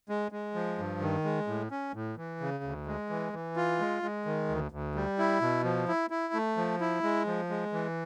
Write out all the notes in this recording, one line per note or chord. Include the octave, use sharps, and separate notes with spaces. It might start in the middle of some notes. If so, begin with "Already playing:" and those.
G#3
G#3
F3
G2
D#3
G#3
A2
C#4
A2
E3
C#3
D2
G#3
E3
E3
F4
G#3
G#3
D#3
D2
D2
G3
E4
B2
F3
E4
E4
A3
F3
E4
G#3
F3
G#3
E3